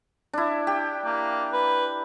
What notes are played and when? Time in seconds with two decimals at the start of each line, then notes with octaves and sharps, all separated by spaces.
0.33 D4 E4
0.67 G4
1.05 A#3
1.52 B4